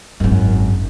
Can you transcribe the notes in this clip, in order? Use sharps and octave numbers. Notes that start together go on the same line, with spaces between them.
G#1 F#2